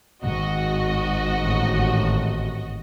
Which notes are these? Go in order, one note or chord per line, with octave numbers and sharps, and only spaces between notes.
G#1 F#4 D#5
A1